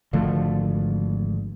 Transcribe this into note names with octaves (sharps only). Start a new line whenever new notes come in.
G#1 D3 F3 A3